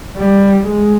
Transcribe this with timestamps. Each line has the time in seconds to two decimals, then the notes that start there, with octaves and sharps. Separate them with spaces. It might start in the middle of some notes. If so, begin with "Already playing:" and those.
0.17 G3
0.68 G#3